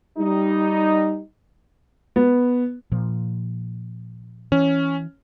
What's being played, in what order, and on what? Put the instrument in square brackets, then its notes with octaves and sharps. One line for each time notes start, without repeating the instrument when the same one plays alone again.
[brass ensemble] G3 D#4
[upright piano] B3
[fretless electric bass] A#2 F3
[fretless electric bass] E3 [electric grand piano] C#4